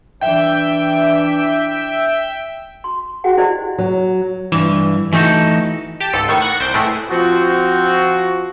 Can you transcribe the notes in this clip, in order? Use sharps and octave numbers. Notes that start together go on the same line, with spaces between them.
E3 D4 E5 G5
C6
F#4 G#4 F#5 G5
E4 G4 C5 D5 D#5
F#3
G2 E3
E3 A3 D#4 F#4 A4
G4 A5
C#2 G#2 A4 C7 D#7
A2 D#3 C#6
F#5 C#6 F#6 A#6
C2 C5 D7
A2 E3 G#3 A3
F3 C4 F4 F#4